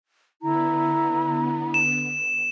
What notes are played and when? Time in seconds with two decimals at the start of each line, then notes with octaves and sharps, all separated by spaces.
0.42 D3 B3 E4 A#5
1.74 E7